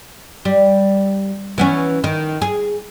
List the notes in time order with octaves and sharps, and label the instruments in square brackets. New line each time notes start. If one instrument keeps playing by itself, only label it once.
[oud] G3
E3 B3 C#4
D#3
G#4